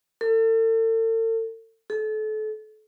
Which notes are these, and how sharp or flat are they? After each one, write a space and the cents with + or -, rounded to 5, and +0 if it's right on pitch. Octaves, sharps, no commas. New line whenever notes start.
A4 +40
A4 -30